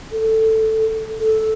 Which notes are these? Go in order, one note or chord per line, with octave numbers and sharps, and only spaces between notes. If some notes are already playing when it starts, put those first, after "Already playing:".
A4
A4